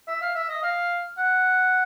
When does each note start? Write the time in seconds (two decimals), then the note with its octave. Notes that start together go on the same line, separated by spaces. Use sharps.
0.08 E5
0.22 F5
0.35 E5
0.49 D#5
0.63 F5
1.17 F#5